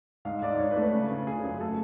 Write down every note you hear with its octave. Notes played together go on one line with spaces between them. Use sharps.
G#2 F5
G#2 D5
D5
G#2 C#5
B4
A3
B4
C#3
C#3
C#3 G#4
F#2 G#4
A3 A4